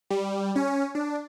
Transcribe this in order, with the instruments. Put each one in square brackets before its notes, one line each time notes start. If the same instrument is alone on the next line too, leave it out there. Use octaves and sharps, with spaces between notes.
[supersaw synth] G3
C#4
D4